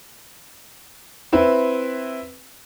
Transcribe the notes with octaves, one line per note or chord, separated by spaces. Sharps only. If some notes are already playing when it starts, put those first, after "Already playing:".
C4 E4 B4